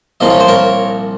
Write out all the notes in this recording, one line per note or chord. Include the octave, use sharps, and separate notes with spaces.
C2 A#2 F3 D#5
C#5
C5
A#4 C#5